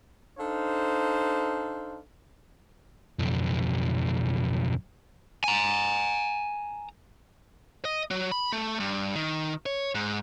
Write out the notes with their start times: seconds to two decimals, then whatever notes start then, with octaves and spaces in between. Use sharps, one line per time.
0.38 D4 D#4 A4 C5 F5
3.19 B1 F2
5.44 G#5 A#5
7.85 D#5
8.11 F#3
8.32 B5
8.52 A3
8.80 G2
9.16 D#3
9.66 C#5
9.95 G#2